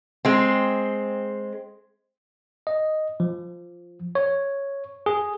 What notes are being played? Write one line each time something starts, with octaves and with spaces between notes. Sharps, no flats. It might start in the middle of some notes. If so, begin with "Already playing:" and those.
G#3 C4
D#5
F3
C#5
G#4